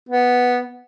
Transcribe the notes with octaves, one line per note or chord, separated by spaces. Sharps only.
B3